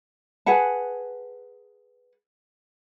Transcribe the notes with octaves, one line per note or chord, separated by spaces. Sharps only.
G#4 B4 F#5 A5